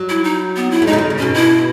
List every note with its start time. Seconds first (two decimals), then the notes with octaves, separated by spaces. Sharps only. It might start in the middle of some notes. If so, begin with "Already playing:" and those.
Already playing: F#3
0.09 E4
0.24 D#4
0.56 B3
0.71 E4
0.82 A3
0.87 G#3 D#4
0.93 C#3
0.98 D#3
1.10 C#3
1.18 B2 C#4
1.34 E4